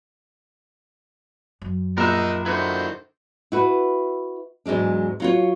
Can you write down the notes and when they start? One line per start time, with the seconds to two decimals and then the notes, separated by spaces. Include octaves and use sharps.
1.62 F#2
1.98 A#1 D#4 A#4 E5 F#5
2.46 D3 D#3 E4 F#4 C5
3.52 E4 F#4 B4
4.66 E2 G#2 F#3 G#3 D4
5.20 F#3 F4 C#5